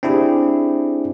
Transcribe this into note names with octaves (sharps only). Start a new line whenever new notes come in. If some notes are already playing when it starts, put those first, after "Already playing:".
C4 D4 E4 G4 G#4